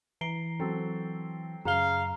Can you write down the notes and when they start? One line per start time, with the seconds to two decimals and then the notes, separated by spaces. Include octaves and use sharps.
0.21 E3 A#5 C7 D7 G7
0.60 F#3 C4 A4
1.65 F#2 C#3 F5 A#5 G7